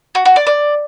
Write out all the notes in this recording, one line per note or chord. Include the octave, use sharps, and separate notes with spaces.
F#4
F#4
D5
D5